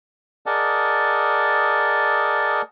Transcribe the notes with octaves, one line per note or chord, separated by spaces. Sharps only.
G#4 A#4 D5 D#5 F#5 A5